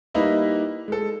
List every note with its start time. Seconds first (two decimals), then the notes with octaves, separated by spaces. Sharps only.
0.14 G3 A#3 D#4 E4 B4 D#5
0.88 G#3 A4